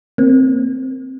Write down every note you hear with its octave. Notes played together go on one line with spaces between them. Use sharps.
A#3 C4